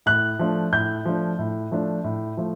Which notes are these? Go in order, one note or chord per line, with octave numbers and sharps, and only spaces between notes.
A2 F#6
F3 A3 D4
A2 G6
F3 A3 D4
A2
F3 A3 D4
A2
F3 A3